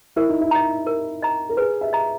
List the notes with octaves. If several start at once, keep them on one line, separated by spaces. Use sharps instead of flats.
E4 A#4
D#4
E4
D#5 A#5
A#4
D#5 A#5
A#4
G#4 B4
E5
D#5 A#5